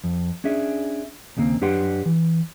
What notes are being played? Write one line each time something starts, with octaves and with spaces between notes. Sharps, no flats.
F2
C#4 D4 G#4 E5
D#2 C#3 G3 A#3 C4
F#2 D4 G4 B4 F#5 C6
E3